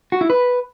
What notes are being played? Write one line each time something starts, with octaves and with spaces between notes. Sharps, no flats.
F#4
E4
B4